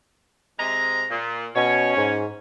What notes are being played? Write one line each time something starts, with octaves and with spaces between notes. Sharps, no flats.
C3 G#3 A#5
A#2
B2 C#4 C#5
G#2